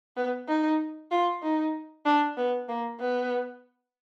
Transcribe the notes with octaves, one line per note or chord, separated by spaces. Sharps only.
B3
D#4
F4
D#4
D4
B3
A#3
B3